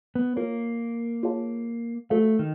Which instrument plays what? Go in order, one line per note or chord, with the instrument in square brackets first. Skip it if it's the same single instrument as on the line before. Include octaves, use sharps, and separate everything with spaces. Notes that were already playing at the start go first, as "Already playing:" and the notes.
[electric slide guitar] B3
[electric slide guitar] A#3 [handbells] F4 A#4 C#5
[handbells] F4 G#4 C#5 F5 A5
[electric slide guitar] A3 [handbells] F#4 A4 C5 F5
[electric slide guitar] D#3